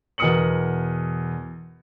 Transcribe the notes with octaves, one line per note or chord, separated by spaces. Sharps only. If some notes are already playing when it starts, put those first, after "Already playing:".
E2 B2 A#4 D#6 C#7 F#7